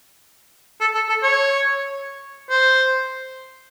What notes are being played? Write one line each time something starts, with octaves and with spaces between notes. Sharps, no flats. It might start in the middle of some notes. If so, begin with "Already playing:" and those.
A4
A4
A4
C#5
C5